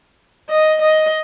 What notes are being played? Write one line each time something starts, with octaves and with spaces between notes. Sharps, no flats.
D#5
D#5